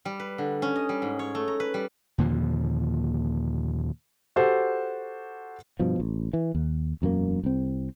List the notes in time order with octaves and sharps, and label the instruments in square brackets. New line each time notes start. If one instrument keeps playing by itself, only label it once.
[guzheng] G3
B4
D3
C#4
D#5
G3
G#2
C#5
A3
A#5
B4
G3
[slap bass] D#2 A#2 D3 F3
[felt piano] F#4 G4 A4 C5
[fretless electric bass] G2 B2 F3
A1
E3
D#2
E1 F#2 F3 A#3
C2 C4